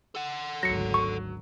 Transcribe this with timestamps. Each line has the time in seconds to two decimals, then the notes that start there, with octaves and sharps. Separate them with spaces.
0.15 A4 F#5
0.63 G#1 D2 F#3 A#6 C#7
0.94 C#6